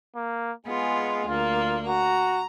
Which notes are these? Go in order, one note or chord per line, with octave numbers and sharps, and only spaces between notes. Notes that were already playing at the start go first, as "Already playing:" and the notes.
A#3
G#3 B3 F4 G#4
D2 A#3 F4
F#4 A#5